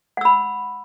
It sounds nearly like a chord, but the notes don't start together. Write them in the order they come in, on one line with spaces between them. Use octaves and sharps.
F#5 E6 B5